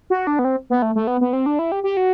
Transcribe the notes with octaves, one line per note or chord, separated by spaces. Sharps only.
F#4
D4
B3
C4
B3
A3
A3
B3
B3
C4
D4
E4
G4
G4
F#4